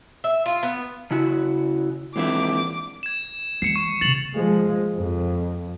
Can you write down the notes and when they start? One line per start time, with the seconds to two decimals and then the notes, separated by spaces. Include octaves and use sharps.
0.24 E5
0.46 F4
0.63 B3
1.11 C#3 E4 F#4
2.16 A#1 E3 G#3 C4 E5 D6
3.03 G#6 E7
3.62 E3 G#3 C7 C#7 E7
3.76 C#6
4.01 C3 C#4 A6 F7 F#7
4.35 F3 G#3
4.96 F2